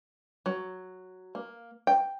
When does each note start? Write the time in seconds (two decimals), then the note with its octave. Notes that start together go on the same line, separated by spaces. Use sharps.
0.46 F#3
1.35 A#3
1.87 G5